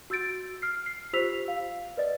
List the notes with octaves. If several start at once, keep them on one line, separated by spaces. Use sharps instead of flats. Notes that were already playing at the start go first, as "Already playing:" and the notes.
F#4 E6 G6 A6 D7
F6 C7
C7
F4 G4 C5 E6 B6 F7
F5
B4 D5 D#5